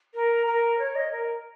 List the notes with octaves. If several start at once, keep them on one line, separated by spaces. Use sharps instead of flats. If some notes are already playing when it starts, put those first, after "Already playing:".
A#4
A#4
C#5
D#5
A#4